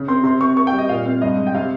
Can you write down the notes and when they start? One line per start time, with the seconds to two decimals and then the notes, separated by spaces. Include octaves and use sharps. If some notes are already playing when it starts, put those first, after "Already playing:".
Already playing: C#3
0.08 C4 C6
0.24 C3 C6
0.40 C4 C#6
0.56 A#3 C#6
0.67 G5
0.73 G3
0.78 D#5
0.89 A#2 F5
1.05 C4
1.21 G2 D#5
1.38 G#3
1.47 G5
1.54 C3 F5